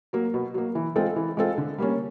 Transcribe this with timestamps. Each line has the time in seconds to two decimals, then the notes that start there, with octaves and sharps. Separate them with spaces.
0.13 F#3 A#3
0.34 B2
0.54 F#3 A#3
0.75 E3
0.96 G#3 C4 F4 A4
1.16 E3
1.37 G#3 C4 F4 A4
1.58 D3
1.78 G3 A#3 C#4